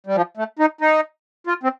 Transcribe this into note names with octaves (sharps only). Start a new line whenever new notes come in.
G3
F3
A3
D#4
D#4
F4
C4